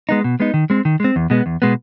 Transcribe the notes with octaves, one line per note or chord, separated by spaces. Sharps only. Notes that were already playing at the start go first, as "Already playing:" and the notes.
G#3 B3 D#4
B2
G#3 B3 D#4
D#3
G#3 C4
D#3
G#3 C4
E2
B2 G#3 B3
E2
B2 G#3 B3